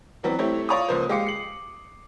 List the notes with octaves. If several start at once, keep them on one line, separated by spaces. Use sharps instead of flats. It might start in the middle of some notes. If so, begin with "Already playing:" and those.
E3 F#3 G3 B3 C4
A3 C4 E4 G4 C#5
F4 C#5 D5 A#5 C#6 D#6
C#2 F3 A#3 B4 C5
G#3 G4 F5 D6 C7 C#7
C7 F#7